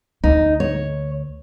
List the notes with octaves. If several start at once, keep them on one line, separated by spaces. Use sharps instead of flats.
D2 D#4
C#5